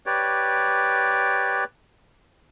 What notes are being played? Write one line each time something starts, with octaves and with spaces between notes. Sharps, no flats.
G4 B4 C#5 D5